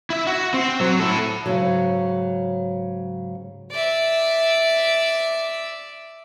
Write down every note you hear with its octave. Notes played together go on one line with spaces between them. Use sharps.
E4 E5
F#4
C4
F#3
E4 A4
G#2 C#3 F#3
D5 E5